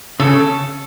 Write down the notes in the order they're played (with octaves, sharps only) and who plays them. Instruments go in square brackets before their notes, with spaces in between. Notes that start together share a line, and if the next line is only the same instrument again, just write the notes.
[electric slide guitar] C#3 [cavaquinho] A4